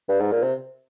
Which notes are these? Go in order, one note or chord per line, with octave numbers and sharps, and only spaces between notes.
G2
G#2
A#2
C3